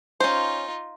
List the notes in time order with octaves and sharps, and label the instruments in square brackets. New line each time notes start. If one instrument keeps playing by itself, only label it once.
[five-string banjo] C#4 C5 [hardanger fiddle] D#4 F4